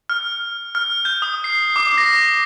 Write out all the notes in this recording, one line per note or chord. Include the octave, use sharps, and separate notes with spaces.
F6
F6
G6
D#6
C7
D6
A#6